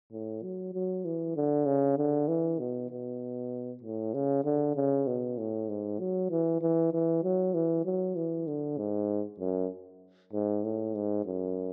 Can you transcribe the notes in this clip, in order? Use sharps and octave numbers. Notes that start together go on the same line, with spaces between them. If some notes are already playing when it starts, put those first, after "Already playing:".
A2
F#3
F#3
E3
D3
C#3
D3
E3
B2
B2
A2
C#3
D3
C#3
B2
A2
G#2
F#3
E3
E3
E3
F#3
E3
F#3
E3
D3
G#2
F#2
G#2
A2
G#2
F#2